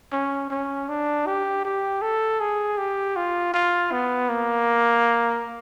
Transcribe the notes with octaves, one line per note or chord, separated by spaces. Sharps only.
C#4
C#4
D4
G4
G4
A4
G#4
G4
F4
F4
B3
A#3